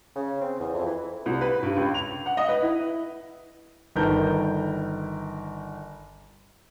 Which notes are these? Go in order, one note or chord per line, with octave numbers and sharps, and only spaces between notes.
C#3
C4
E2
F2
E3
C2
B4
G2
C#2
F7
F#5
D#5
B4
E4
G1 D#3 A#4 B4 A5 G6